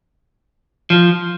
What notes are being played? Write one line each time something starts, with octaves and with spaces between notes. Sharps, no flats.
F3